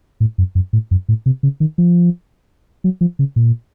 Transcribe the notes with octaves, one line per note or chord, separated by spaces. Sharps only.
A2
F#2
F#2
A2
F#2
A2
C3
C#3
D#3
F3
F#3
F3
C#3
A#2